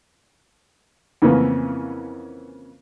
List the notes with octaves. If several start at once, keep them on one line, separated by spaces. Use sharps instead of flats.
F2 C#3 E3 A#3 B3 C#4